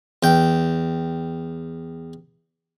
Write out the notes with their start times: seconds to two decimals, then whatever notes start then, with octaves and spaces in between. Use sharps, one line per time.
0.23 E2 G5